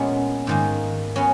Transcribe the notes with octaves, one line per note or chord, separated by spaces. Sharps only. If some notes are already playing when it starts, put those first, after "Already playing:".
Already playing: A#2 G#3 B3 C#4
G#2 D#3 A#3
F#3 B3 C#4